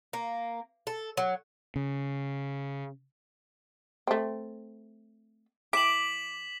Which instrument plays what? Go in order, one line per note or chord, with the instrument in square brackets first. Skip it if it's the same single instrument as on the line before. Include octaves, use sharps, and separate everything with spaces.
[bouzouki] A#3
A4
F#3
[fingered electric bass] C#3
[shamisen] A3 C4
[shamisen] E3 [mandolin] D6 [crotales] B6 E7 F#7